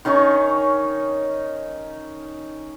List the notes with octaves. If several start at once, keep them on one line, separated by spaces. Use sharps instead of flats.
D#3 C#4 D#4 C#6